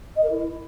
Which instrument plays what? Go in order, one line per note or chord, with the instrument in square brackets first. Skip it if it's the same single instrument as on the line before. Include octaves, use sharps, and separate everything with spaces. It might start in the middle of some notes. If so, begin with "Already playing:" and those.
[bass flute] D#5
A#4
E4